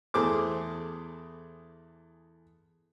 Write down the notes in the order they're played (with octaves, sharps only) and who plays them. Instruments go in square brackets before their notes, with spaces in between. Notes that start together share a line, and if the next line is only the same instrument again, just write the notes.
[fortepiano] E2 A3 G#4 C5 D6